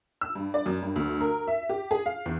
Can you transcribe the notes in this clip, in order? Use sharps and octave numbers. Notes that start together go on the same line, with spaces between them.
E6
G2
D5
F#2
G2
D2
A#4
E5
G4
G#4
F5
E2